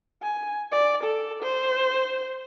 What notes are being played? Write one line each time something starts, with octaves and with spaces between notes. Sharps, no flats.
G#5
D5
A4
C5